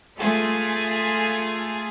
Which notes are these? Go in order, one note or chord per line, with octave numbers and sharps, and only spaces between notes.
A3 F4 G#4